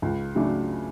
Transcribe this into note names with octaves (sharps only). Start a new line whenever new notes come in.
C#2
C#3 F#3 A3 D4